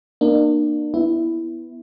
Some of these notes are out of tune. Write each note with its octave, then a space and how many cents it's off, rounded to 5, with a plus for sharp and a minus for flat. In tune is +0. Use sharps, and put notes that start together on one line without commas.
A#3 +10 D4 +40
B3 +0 E4 +0